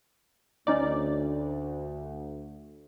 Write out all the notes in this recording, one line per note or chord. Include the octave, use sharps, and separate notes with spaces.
D2 C#4 D#4 D5